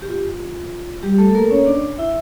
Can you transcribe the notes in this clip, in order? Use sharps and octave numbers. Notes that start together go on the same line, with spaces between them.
G4
F4
G3 G4
A3 A4
A4
A#3 A#4
C#4 C#5
D4 D5
E4 E5